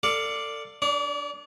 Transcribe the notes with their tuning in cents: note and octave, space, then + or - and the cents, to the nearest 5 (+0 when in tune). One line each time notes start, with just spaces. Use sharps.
A4 +35 D5 +0 F5 +0
D4 +0 D5 -40